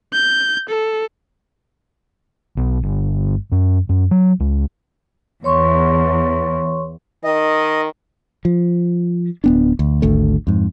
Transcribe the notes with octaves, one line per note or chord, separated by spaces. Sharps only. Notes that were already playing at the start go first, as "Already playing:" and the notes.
G6
A4
B1
G1
F#2
F#2
F#3
C#2
E2 C#5 C6 C#6
D#3 D#5
F3
D1 B3 D4
D2
G#1 D2 A3
F2 G#2